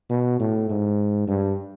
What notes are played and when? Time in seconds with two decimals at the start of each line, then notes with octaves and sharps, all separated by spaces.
0.10 B2
0.40 A2
0.70 G#2
1.27 G2